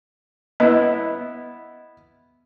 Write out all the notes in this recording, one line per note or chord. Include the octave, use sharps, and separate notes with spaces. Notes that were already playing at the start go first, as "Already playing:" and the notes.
B3 E4 D#5